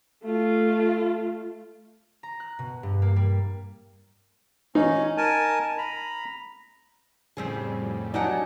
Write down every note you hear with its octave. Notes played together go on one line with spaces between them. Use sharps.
A3 F4
A#5
F#6
B2
G2
A#3
G3
C#4 D#4
A#4 G#5 A5
A#5 B5
F2 A2 C#3 G3 C4 G#4
B2 F#3 D4 D#4 G4 F#5 G#5 A5